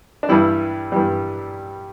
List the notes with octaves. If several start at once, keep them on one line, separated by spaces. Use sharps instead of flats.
D4
G2 E3 G3 E4
G2 E3 G3